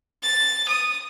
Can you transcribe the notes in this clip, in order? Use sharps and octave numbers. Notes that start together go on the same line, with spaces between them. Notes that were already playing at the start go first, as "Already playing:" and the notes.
A6
D#6